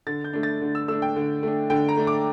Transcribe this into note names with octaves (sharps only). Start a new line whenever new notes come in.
D3 A6
G6
A3 D4
A6
D3
E6
A3 D4 E6
G5
D3
A3 D4
D3 G5
A#5
A3 D4
D6